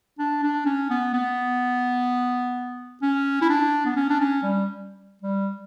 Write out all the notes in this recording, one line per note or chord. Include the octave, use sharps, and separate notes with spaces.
D4
D4
C#4
B3
B3
C#4
E4
D4
B3
C#4
D4
C#4
G3
G3